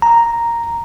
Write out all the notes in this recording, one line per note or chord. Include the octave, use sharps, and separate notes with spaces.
A#5